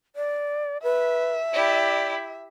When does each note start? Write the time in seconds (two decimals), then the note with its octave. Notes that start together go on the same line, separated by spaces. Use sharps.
0.16 D5
0.83 B4 E5
1.53 E4 G4 D5